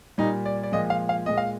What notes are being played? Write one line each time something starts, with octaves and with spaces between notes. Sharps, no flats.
A#2 G3 D#4
D5
D5
A#2 F3 G#3 D#5
F5
F5
A#2 G#3 D#5
F5